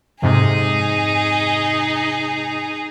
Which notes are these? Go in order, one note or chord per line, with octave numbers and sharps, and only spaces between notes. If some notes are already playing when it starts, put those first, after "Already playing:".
F2 G#2 C3 D#4 G#4